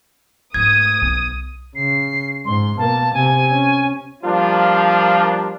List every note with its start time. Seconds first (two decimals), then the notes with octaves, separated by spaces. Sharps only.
0.54 G#2 A3 D#6 G#6
1.02 B1
1.76 C#3 C7
2.45 G#2 C6
2.78 B2 A#3 A5
3.14 C3 G#5
3.50 C#4
4.23 F3 G3 A#3 D4 F4